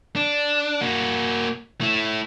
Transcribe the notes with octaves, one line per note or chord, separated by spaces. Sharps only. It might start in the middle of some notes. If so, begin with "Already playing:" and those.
D4
A#3 F#4
A3 E4